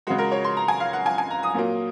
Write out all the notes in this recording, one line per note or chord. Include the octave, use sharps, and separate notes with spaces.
C#3 G#3 F#4
A#4
C#5
C6
A#5
G#5
F5
F#5
G#5
G#5
A#5
D#6
A#2 F#3 A#3